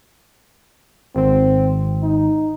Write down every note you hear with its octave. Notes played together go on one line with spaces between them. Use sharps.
G#1 C4
D#4